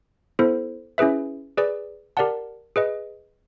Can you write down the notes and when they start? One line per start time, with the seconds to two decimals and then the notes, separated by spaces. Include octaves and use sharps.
0.39 B3 E4 A4 C5
0.98 C#4 E4 G#4 B4 E5
1.57 G#4 B4 D5
2.17 G4 A#4 D5 F#5 A5
2.76 G#4 B4 D#5